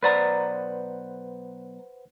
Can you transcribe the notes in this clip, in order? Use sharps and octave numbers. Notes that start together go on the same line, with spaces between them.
B1 B4 C5 D5 F#5 A#5